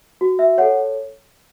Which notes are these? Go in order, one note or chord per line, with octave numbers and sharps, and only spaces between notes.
F#4
E5
A4 C#5 F#5